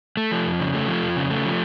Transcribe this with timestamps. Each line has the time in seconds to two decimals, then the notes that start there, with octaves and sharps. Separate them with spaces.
0.17 A3
0.32 F3
0.46 F2
0.59 C#3
0.74 A3
0.88 F3
1.02 F2
1.17 C#3
1.30 A3
1.45 F3